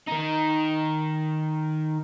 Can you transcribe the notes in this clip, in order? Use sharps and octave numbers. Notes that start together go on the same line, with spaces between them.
D#3 D#4